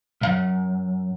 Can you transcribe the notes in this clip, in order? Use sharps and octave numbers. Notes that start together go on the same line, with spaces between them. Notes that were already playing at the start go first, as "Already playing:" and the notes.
C2 F#2